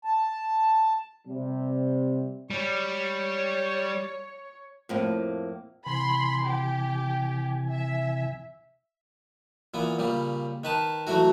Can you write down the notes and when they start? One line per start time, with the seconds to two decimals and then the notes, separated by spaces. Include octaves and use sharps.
0.05 A5
1.27 C3 G3
2.50 G3 C#5
4.89 F2 A2 A#3
5.86 C3 E3 G#5 B5 C6
6.45 G4
7.71 E5
9.74 A#2 E3 B3
9.99 A#2 C#3 G3
10.64 D#3 B4 A5
11.07 E3 F#3 A3 E4 F#4